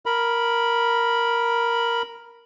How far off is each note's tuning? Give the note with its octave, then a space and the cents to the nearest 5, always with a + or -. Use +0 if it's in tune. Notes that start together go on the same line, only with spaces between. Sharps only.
A#4 +0 B5 -10